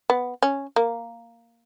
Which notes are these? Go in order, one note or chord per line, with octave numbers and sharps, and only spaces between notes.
B3
C#4
A#3